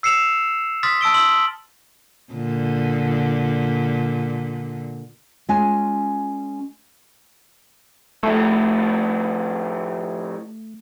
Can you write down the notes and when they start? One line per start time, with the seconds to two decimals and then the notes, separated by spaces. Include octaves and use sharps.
0.03 E6 C7 C#7 E7 F7
0.83 C6 D#6 F6 A6 B6
1.01 A5 E6 D7 G7
1.14 C6 E6 F#7
2.33 A#2 D3
5.49 G#3 C#4 F4 G#5
8.23 A2 F3 A3